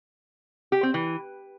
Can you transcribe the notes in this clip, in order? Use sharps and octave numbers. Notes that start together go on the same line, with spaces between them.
G4
C4
E3